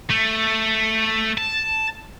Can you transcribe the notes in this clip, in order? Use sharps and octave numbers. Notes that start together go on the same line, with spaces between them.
A3
A5